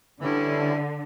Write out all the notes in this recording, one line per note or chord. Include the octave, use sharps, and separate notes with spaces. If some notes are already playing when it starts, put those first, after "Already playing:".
D3 E3 G3 C#4 E4